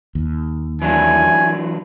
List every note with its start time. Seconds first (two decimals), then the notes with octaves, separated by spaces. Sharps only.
0.15 D#2
0.82 E3 F#3 D4 E4 G#5